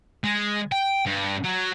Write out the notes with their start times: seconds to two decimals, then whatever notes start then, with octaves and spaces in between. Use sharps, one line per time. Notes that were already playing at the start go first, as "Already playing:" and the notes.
0.24 G#3
0.72 G5
1.06 G2
1.44 F#3